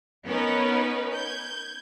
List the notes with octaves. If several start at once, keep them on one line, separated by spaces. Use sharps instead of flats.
B3 C#4 D#4 A#4 B4
G6 G#6